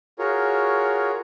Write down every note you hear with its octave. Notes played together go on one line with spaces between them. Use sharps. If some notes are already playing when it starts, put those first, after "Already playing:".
F4 F#4 G#4 A#4 C#5